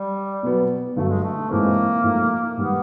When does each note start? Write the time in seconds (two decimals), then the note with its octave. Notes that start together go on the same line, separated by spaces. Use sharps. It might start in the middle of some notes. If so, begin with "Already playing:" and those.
Already playing: G3
0.43 B2 F#3 B3
0.96 G2 D3 F#3 A3
1.09 G#3
1.22 A3
1.50 G#2 E3 G#3 A#3 C4
2.04 G#2 F3 A3
2.57 G#2 D#3 G3 B3